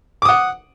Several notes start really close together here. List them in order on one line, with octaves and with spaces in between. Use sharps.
D6 D#6 F#5